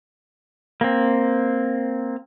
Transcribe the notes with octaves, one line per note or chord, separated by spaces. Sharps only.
A#3 C4